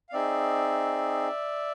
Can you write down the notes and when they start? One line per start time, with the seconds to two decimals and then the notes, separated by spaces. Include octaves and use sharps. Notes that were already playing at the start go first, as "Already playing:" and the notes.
0.09 F5
0.13 C4 D#4 G#4 D5 E5